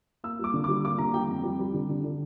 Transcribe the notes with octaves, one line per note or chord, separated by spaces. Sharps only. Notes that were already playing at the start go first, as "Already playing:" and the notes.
A#3 E6
G3 D6
D3
D6
G3
A#3 D6
D3 A#5
G3 G5
F2
G3
G3
D3
D3
D3